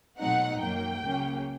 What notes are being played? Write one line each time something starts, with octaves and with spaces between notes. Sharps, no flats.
B2 F#3 A3 C4 D#4 F#5
F#2 D#3 F#3 A#3 G5
C#2 C#3 F#3 A#3 C#4